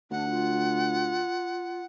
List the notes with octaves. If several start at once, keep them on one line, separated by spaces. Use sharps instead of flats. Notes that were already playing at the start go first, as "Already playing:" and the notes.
D2 D4 F#5
F4